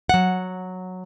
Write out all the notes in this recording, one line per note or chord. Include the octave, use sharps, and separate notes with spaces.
F#3 F#5